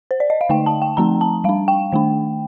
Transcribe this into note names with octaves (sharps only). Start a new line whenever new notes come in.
C5
D5
D#5
F5
D3 A3 D#4 G5
A5
G5
F3 A3 C4 D#4 A#5
A5
G3 D4 F5
G5
D#3 A3 D4